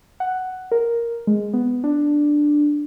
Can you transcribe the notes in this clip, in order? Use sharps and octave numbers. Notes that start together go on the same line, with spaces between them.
F#5
A#4
G#3
B3
D4